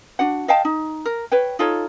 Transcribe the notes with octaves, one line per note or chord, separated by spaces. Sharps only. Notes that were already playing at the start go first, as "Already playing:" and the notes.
D4 F#4 F#5
D#5 F5 G5 A5
D#4
A#4
B4 C#5 G5
D#4 F4 A4 C#5